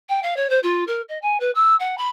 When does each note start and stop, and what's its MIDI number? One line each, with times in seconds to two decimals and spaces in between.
0.09 0.22 79
0.23 0.37 77
0.37 0.50 73
0.50 0.59 72
0.63 0.84 65
0.87 1.02 70
1.09 1.18 75
1.22 1.38 80
1.40 1.51 71
1.55 1.75 88
1.80 1.95 78
1.98 2.10 83